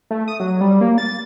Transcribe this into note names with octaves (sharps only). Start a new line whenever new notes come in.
A3
D#6
F#3
G3
A#3
A6